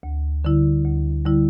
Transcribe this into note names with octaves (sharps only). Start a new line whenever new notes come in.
D2
D3 G3 E4
D2
D3 G3 E4